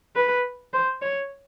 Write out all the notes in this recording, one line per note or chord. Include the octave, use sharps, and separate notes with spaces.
B4
C5
C#5